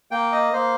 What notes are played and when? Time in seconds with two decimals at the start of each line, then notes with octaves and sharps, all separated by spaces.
0.11 A#3 G5
0.32 D#5
0.53 A#3 C5